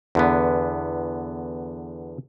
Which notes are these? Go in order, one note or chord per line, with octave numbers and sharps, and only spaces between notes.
E2 D3 B3